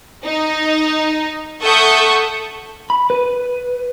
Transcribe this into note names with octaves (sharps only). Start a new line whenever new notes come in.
D#4
A4 E5 F#5 C#6 D#6 G6
B5
B4